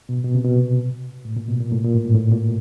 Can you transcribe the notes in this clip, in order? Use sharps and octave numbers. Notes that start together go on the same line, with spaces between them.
B2
B2
C3
B2
A2
A#2
B2
A#2
A2
A#2
A2
G#2
A2
A#2